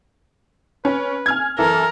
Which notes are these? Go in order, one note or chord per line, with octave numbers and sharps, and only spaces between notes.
C#4 B4
G#5 F6 G#6
F#2 E3 A4 A#4